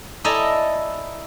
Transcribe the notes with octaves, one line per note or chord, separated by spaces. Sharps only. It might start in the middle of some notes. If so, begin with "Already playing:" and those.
E4 A4 D5 D#5 G#5 A#5